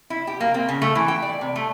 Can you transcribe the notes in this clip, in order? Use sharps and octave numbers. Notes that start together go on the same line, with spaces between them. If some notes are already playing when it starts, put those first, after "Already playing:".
E4
G4
A#3
C4
C#3
A3
E3
G5
D5
C3
A3